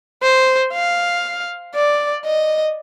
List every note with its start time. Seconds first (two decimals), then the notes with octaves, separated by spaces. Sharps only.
0.23 C5
0.73 F5
1.75 D5
2.26 D#5